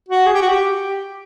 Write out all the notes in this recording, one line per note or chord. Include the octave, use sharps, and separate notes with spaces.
F#4
G#4
G4
F#4
G4